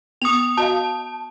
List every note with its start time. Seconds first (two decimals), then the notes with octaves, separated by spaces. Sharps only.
0.22 B3 C#6 D#6 F7
0.57 F#4 D#5 F5 A5